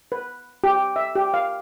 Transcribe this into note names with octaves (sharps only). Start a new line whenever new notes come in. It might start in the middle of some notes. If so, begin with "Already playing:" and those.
B4
G4
E5
G4
F5